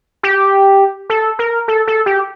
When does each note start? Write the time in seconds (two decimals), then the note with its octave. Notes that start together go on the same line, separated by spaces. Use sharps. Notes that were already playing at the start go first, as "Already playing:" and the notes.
0.23 G4
1.10 A4
1.39 A#4
1.68 A4
1.87 A4
2.06 G4